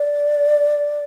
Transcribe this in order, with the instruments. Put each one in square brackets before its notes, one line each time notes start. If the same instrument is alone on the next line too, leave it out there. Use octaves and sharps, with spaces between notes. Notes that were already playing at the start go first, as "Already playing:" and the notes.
Already playing: [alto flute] D5